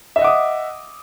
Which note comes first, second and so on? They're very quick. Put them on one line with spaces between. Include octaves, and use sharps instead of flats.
E5 D#5 F#5 D6 D#6